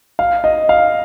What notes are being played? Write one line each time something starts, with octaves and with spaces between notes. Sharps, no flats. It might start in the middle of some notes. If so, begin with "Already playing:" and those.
F5
D#5
F5